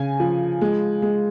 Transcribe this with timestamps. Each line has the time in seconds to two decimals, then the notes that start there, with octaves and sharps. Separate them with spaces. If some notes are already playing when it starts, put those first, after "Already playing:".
Already playing: C#3 G#5
0.20 F3
0.61 G#3
1.02 G#3